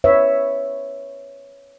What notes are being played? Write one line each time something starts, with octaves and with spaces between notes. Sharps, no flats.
B4 C#5 E5